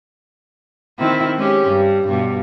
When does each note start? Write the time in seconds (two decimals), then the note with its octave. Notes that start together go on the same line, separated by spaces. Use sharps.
0.99 D#3 C4 E4
1.37 G#3 C#4 G4
1.68 G2
2.07 G2 B2